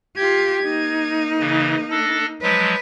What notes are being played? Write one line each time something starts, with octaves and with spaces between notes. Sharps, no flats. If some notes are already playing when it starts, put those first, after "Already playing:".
F4 G4 G#6
A#3 D#4
C#3 E3
D4 A4 A#6
F3 F#3 G#3 B4